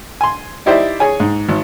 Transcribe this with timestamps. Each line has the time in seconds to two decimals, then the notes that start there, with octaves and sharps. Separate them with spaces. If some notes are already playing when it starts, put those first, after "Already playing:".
0.21 G#5 C6
0.66 D#4 E4 G4 C5 D5 E5
1.00 G#4 C#5 G#5
1.20 G#2
1.49 G#1